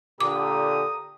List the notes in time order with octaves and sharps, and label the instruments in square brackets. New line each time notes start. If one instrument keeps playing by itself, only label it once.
[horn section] A#2 D3 [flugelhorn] G4 [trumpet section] A#5 D#6 [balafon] D6